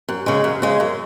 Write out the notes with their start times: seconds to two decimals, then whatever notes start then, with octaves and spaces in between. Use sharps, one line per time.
0.09 F#2
0.26 C#3 G#3
0.44 F#2
0.62 C#3 G#3
0.80 F#2